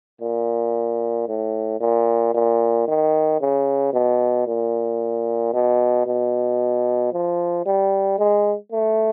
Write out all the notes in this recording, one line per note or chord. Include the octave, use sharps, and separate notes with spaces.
A#2
A2
A#2
A#2
D#3
C#3
B2
A#2
B2
B2
F3
G3
G#3
A3